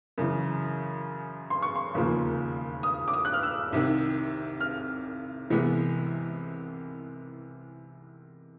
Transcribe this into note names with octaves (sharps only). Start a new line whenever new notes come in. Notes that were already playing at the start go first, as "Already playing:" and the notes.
F#2 C#3 E3
C6
C#6
C6
E1 D#2 C#3 F3 A#3
D#6
D6
D#6
F#6
F6
E6
C2 C3 D#3
F6
C2 C3 E3 G#3 B3